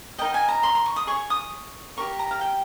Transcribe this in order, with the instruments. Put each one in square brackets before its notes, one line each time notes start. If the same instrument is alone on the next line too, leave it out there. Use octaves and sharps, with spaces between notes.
[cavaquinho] D#4 A#4 D#5 G5
G#5
A#5
C6
C6
C#6
D#6
G#4 C#5 C#6
D#6
G4 A#4 C#5 C#6
A#5
F5
G5